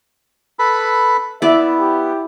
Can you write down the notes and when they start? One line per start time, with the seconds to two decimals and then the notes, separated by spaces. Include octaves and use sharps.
0.59 A4 B4 B5
1.42 B3 E4 D5 E5
1.79 G4